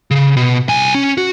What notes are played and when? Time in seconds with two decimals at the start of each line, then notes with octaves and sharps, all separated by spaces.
0.11 C#3
0.37 B2
0.69 C2 G#5
0.95 C#4
1.17 F#4